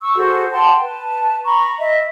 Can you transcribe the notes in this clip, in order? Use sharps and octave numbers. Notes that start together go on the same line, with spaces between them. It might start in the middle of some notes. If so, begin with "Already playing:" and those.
C#6 E6
F#4 G#4 A4 C5
F#5 G5 A5 C6
B4 A5
A#5 B5 C#6
D#5 E5